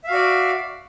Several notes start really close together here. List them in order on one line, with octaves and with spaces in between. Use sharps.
E5 F5 F#4 D5